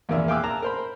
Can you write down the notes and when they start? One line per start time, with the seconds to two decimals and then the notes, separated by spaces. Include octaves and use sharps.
0.09 A#1 E2 C3 A#4 D5 E5
0.28 F5 G5 G#5 D6 E6 F#6
0.43 A#4 A5 A#5
0.62 A#4 C5 B5